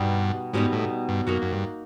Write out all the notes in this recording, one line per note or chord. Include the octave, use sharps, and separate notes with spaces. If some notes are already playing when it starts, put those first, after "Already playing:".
Already playing: G2 B2 G3 B3 D#4
G#2 B2 G3 B3 D#4
A2
G2
F#2 A#3 D#4 F#4
F#2
G2